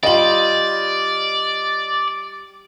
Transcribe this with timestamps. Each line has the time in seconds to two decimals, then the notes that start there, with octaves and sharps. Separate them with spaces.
0.03 G3 F4 D5 D#5 F#7